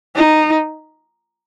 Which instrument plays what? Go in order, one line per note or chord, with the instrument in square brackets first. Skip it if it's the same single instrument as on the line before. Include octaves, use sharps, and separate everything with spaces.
[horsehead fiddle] D#4